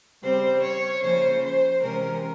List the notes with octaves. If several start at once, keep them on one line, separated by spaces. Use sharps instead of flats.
C#3 G3 C4 C5
C#5
C#3 F3 A#3 C#4 C5
C5
C3 E3 G#3 C#4 A#4